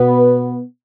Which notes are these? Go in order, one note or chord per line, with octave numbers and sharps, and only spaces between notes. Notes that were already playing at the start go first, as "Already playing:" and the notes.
Already playing: B2 B3 B4